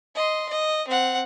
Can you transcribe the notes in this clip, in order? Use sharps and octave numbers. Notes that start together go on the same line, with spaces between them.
D#5 C6
D#5
C4 F#5